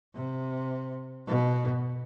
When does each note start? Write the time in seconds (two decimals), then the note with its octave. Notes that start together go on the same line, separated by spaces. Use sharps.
0.14 C3
1.27 B2